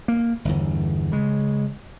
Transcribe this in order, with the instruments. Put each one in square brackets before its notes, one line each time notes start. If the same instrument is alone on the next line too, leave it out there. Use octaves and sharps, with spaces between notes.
[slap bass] A#3
G1 E2
C#3 G#3